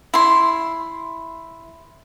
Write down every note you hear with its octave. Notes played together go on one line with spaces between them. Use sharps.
E4 C6